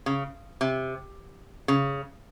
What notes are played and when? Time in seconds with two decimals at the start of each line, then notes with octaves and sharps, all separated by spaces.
0.06 C#3
0.61 C3
1.68 C#3